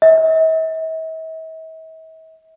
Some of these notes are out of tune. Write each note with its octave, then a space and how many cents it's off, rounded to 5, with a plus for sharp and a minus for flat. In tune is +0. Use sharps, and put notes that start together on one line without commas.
E5 -45